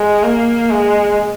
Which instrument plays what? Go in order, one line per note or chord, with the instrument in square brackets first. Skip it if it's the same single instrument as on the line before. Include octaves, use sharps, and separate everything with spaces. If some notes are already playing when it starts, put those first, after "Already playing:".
Already playing: [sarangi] G#3
A#3
G#3